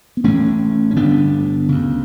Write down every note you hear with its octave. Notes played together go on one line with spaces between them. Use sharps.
B3
A1 A2 A3 C#4
C#4
G1 G2 D3 B3 D4
D2 C#3